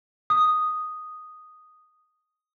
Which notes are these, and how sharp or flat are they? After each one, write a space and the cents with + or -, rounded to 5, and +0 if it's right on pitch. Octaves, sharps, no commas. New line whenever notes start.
D#6 +0